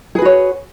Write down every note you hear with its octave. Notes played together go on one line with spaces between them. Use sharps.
F#4 G#4 B4 C#5